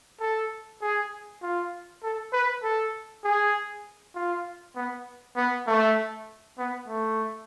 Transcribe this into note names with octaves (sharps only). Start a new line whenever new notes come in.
A4
G#4
F4
A4
B4
A4
G#4
F4
B3
B3
A3
B3
A3